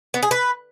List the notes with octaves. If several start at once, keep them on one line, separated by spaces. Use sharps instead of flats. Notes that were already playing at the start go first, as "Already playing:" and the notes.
B3
G#4
B4